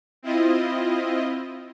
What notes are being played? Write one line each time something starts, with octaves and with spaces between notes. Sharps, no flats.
C4 E4 F4 D#5